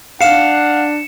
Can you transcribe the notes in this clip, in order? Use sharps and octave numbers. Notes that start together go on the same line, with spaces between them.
D4 F5 F#5 C#7 E7